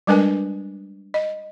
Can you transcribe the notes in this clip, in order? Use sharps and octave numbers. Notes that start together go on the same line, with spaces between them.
G3 G#3 D4 A#4 B4 G#5
D#5